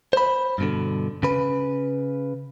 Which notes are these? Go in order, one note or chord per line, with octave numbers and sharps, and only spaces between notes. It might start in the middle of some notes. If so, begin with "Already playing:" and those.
C5 B5
G2 B2 D3
C#3 B4